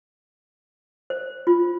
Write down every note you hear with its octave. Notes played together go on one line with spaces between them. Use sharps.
C5
F4